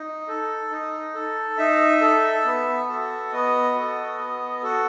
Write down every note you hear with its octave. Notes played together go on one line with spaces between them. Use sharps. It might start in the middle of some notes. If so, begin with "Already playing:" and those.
Already playing: D#4
A4
D#4
A4
D#4 E5
A4
B3
F#4 A4
B3 D#5
F#4 A4
B3
F#4 A4